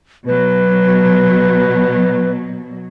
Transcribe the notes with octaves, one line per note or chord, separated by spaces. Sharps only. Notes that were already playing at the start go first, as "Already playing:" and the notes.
B2 F#3 B4